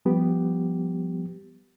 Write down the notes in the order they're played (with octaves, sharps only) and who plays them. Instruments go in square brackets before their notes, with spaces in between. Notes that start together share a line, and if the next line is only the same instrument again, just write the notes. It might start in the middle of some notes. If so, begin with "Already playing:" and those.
[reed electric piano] F3 G3 B3 G4